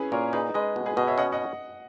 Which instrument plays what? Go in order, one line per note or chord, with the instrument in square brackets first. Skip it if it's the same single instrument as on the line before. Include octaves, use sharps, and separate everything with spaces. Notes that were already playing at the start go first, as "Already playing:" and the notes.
Already playing: [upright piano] C#4 E4 G#4 B4
[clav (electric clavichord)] A#2 [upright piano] A#4 C#5
[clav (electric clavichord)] D#4 [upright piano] G#4 B4
[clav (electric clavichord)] G#3 [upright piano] B4 D#5
[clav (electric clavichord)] B2
[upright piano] G#4 B4
[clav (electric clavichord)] B2 [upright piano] B4 D#5
[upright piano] C#5 E5
[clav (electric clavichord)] C#4 [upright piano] D#5 F#5
[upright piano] D#5 F#5